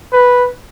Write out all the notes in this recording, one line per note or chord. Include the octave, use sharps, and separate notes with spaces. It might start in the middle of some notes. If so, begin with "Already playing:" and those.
B4